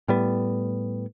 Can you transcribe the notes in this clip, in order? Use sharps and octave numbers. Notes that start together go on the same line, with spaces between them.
A2 G3 B3